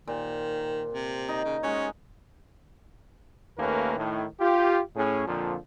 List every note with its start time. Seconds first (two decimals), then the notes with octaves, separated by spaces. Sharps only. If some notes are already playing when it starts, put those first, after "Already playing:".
0.07 A#2 D#3 G4 C5
0.93 C3
1.28 D#4 D#5
1.45 C#3
1.63 G#3 C#4 F#4 G#5
3.58 D#2 A3 A#3 C#4 A#4 B4
3.97 A2 D#3
4.40 F4 G4
4.96 A2 C#4 G#4
5.27 F2 A#2 D3 F3